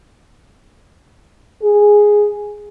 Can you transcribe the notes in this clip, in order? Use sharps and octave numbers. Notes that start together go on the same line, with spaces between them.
G#4